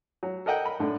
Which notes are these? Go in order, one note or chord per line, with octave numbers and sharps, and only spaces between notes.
F#3
A4 A#4 D#5 F#5 G5
B5
A2 D3